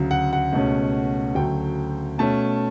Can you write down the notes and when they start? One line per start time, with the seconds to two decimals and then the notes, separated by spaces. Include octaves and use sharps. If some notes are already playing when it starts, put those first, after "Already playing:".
Already playing: D2 C#3 F#3
0.11 F#5
0.33 F#5
0.53 C#2 B2 A3 C#4
1.35 D2 C#3 F#3 A3 G5
2.18 B2 A3 C#4 A5